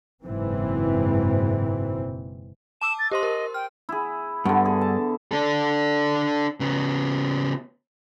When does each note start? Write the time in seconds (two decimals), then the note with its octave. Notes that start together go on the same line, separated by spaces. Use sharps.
0.24 F#1 G#2 B2 E3 C4
2.82 A5 D6 E6 E7
2.99 A6
3.12 G4 C5 D#5 C6
3.23 A#4
3.54 G5 F6
3.89 E4 G#4
4.45 G2 D3 B3
4.65 G#4
4.81 A5
5.31 D4 A4
6.60 C#3 B3